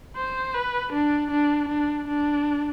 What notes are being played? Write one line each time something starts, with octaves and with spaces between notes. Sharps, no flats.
C5
B4
D4
D4
D4
D4